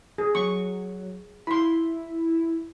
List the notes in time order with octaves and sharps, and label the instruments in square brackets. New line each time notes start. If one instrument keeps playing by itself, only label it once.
[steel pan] G#4
[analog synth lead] F#3 [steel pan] C#6
[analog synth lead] E4 [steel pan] B5 C6